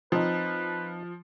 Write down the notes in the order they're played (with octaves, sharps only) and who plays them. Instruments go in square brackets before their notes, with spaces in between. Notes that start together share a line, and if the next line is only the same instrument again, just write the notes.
[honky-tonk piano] F3 [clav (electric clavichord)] C4 D#4 [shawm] B4